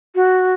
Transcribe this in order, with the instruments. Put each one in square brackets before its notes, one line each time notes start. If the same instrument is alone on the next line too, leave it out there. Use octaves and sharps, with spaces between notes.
[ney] F#4